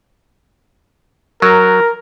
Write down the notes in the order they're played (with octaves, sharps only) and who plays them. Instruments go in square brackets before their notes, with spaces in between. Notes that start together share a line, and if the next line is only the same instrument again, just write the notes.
[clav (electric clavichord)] F#3 [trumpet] A#4